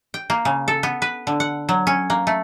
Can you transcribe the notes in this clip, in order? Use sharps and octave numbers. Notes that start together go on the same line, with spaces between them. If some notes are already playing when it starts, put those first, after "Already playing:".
G5
A#3
C#3
A4
B3
B4
D3
F#5
F#3
C#4
A#3
A3